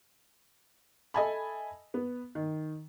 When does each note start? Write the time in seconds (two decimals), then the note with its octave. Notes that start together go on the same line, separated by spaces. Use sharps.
1.14 A4 D#5 E5 G#5 A5 B5
1.94 B3
2.35 D#3